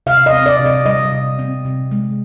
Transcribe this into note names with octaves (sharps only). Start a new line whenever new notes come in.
C3 F5
D#5
C4
D5
C3
D#5
G3 D#5
C3
C4
C3
G#3